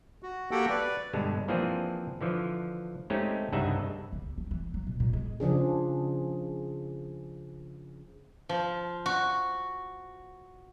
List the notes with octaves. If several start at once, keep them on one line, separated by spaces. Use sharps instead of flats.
F#4
A#3 F#4 G4 A4 F#5 G5
B4 D5
G2 B2 D3 G#3
E3 F3 A#3 C4 D4 G#4
D3 E3 F3
G#3 A3 C4 C#4 D#4 G4
C2 G2 C#3 D#4 E5 F#5
D3
D2
C4
E3
F#3
B2
A#2
G#3
C#3 F3 D4 G#4
F3
F#4